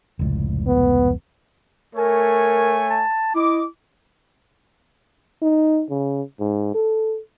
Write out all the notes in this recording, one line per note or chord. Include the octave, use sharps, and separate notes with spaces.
F1 C#2 A2
B3
A3 A#4 C#5 G#5
A5
E4 D#5 D6
D#4
C#3
G#2
A4